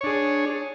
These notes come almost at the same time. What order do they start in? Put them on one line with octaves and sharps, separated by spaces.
C#5 D4 G#4